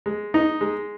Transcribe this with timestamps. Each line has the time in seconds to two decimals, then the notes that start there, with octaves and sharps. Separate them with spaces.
0.06 G#3
0.34 D#4
0.61 G#3